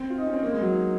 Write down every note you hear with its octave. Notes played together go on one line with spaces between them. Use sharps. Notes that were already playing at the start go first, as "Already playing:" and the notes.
Already playing: C4
F4
D#4
C#4
C4
A#3
G#3
F#3
D#4